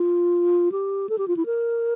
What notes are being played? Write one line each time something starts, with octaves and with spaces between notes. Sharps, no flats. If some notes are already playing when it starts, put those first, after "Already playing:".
Already playing: F4
G4
A4
G4
F4
E4
A#4